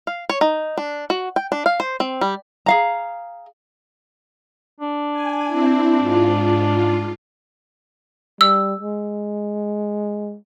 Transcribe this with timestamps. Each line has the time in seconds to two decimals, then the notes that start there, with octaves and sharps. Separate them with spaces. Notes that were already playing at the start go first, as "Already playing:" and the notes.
0.07 F5
0.29 C#5
0.41 D#4
0.78 D4
1.10 F#4
1.36 G5
1.52 D4
1.66 F5
1.80 C5
2.00 C4
2.21 G3
2.66 G#4 F5 A#5
4.81 D4
5.13 G#5
5.47 C4 E4
5.99 G#2 F4
8.41 G3 E6
8.80 G#3